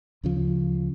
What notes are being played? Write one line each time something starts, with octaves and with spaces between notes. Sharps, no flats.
D2 C#3 F3